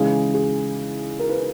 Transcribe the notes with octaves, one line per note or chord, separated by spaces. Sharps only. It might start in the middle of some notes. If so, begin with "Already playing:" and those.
Already playing: C#3 E3 G#3 G#4
G#4
A#4
B4